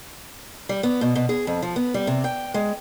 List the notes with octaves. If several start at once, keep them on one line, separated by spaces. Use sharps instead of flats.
G3
B3
B2
B2
G#4
F2
F3
B3
G3
C3
G5
G#3